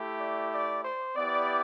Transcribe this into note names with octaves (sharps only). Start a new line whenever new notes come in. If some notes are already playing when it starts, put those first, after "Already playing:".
Already playing: A3 E4 G4
D5
D5
C5
B3 E4 G4 D5